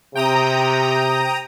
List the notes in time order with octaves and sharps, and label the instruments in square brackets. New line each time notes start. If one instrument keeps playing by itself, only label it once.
[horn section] C3 [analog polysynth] G5 A#5 D#6